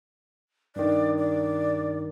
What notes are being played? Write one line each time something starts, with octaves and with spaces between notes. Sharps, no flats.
G2 D#3 D5
D5